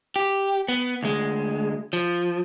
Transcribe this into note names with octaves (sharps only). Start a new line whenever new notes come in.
G4
B3
D2 G#3
F3